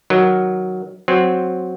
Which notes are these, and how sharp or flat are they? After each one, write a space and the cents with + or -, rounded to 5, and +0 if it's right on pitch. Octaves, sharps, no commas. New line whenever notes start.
D#3 +0 F#3 +0 A#4 +5
F#3 -5 C4 +0 C5 +10